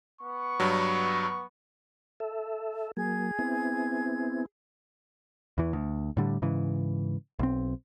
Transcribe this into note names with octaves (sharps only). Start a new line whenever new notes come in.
B3 C#6
G2 F#3
A4 E5
F#3 A#3 G#4 G#6
B3 C4 E4
E2 E3
D2
A2 D3 G3
G#2 C#3 E3
B1 C4